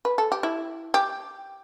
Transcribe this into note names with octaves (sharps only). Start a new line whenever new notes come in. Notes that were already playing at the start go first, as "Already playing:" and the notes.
B4
A4
G4
E4
G4